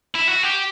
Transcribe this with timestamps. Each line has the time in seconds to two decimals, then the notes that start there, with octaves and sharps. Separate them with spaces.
0.15 E4
0.29 F#4
0.43 G4